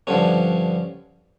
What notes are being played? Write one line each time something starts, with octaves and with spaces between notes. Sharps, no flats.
G2 D3 F3 C#4